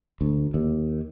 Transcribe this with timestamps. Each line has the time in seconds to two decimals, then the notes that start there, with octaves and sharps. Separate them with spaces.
0.21 D2
0.54 D#2